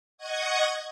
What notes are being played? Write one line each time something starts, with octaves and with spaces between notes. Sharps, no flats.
D#5 F#5 C#6 D#6 G#6